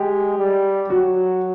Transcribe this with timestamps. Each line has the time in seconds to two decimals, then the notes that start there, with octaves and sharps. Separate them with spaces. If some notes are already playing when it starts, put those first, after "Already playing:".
Already playing: G#3 G4
0.38 G3
0.90 F#3 F#4